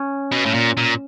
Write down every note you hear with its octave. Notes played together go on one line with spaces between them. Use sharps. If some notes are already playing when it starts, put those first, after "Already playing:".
Already playing: C#4
B2
A2
A#2
A#2